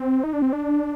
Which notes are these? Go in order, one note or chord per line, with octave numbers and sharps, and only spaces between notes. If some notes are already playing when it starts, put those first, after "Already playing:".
Already playing: C4
D#4
D4
C4
D4